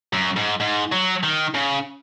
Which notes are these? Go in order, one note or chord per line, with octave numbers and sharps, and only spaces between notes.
F#2
G#2
G#2
F#3
D#3
C#3